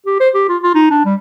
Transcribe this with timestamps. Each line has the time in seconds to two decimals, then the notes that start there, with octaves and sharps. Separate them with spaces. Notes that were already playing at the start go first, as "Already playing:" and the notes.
0.06 G4
0.20 C5
0.34 G4
0.49 F4
0.63 F4
0.74 D#4
0.91 D4
1.05 G3